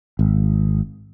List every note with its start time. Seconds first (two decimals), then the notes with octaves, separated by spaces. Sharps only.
0.19 G#1